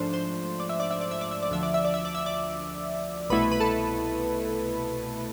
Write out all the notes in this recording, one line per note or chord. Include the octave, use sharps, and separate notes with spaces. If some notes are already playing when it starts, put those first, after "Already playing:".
Already playing: G#2 F3 A3 D4 C5
C5
D5
E5
D5
E5
D5
E5
D5
E5
D5
D2 D3 F3 E5
D5
E5
D5
E5
D5
E5
D5
C2 B2 A3 E4 B4
B4
A4